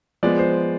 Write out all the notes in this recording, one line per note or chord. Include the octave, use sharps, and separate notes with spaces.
F3 G#3 B3 D5
C5